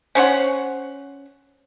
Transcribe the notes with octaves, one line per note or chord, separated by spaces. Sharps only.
C#4 C5 C#5 F#5